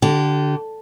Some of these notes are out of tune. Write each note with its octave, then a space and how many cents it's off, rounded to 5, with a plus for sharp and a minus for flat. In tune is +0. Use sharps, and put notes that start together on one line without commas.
D3 +0 G4 -30